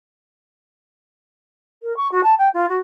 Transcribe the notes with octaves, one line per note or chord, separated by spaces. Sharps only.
A#4
C#6
F#4
A5
G5
F4
F#4